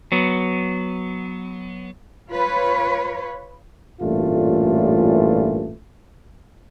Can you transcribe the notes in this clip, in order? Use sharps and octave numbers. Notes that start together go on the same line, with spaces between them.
F#3 B3
F4 B4 C#5
A1 G2 A#2 E3 A3 F4